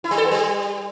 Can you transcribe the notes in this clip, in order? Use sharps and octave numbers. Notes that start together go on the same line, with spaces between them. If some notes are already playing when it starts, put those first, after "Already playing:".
E4
G3
A4
B3
G3